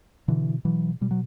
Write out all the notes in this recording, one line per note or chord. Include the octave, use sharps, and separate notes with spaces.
B2 D3 E3
B2 E3 F#3
B2 G3
F#3